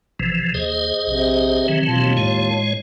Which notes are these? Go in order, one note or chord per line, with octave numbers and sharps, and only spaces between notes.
A1 C3 E3 F3
D#2 G#4 C5 D#5
A#1 C3
D#3 E3 F#3 C4
D#2 B2 F4 A5
A2 G#3 C#5